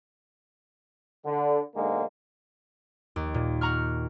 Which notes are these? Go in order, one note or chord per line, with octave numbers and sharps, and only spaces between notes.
D3
B1 G#2 D3 G#3 A#3
D#2
A#2
F#5 A#5 C#6 F6